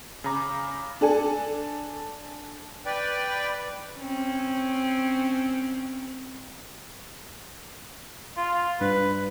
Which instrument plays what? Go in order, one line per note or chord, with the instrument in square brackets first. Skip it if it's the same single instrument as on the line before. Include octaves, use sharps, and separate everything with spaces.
[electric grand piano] C#3 A#5 [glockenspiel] B5 D6
[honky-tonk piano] D4 A4 G#5
[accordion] B4 D5 G5
[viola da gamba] C4 C#4
[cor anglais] F4
[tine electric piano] G2 [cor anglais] B4